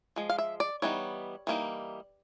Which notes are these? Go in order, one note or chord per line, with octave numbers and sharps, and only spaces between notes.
F3 G#3
F5
E5
D5
E3 G3 B3 D#4 C#5
E3 G3 A#3 D#4